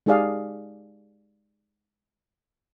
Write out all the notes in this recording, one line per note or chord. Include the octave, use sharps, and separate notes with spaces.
G#3 D#4 G4 G#4 D5 F5